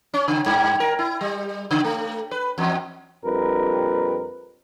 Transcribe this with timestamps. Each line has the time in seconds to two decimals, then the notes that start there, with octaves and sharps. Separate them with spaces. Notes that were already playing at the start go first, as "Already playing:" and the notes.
0.14 C#4
0.28 C#3
0.46 G2
0.80 A#4
0.99 E4
1.21 G3
1.71 C#3
1.84 A3
2.31 B4
2.58 E2
3.25 A#1 F2 G3 A#4 B4